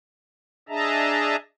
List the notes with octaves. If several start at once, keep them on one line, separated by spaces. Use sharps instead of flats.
D4 G#4 D#5 E5 A5 A#5